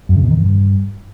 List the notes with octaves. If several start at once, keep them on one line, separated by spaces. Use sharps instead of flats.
F#2
C#3
B2
D#3
G2